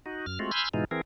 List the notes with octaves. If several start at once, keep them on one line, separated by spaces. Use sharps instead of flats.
D#4 F#4
F#2 F6
G#3 A3 C4 F4 F#4
G#5 B5 C6 E6 F6 G6
G#2 B2 E3 G#3 D#4 F4
E3 C4 G#4 A#4